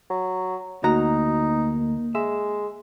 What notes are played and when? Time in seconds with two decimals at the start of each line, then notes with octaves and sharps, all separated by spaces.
0.10 F#3
0.84 D2 A#3 D#4 F#4 A#5
2.15 G#3 E5